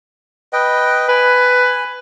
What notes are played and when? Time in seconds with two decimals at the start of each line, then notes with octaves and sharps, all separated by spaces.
0.53 B4 D#5 G5
1.08 B4 G#5